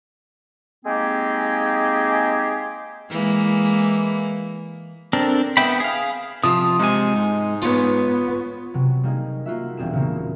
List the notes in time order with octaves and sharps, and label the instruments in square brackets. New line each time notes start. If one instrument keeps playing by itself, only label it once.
[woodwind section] G#3 A#3 C4 D#4 G4 G#4
[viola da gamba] E3 G#3 A#3
[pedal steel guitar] C4 D4 A4 A#4
B3 E5 G5 B5
G#4 F5
[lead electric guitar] C3 F3 [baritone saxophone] F4 [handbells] D#6
[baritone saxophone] C3 [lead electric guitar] G#3 G#5
[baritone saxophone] G#2
[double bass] B3 [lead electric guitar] F4 C#5
[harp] C3 F#3
G3 A#3 D#4 G#4
A#3 F4 F#4 E5
E1 G3 C4 G#4 E7
A#2 C#3 A#3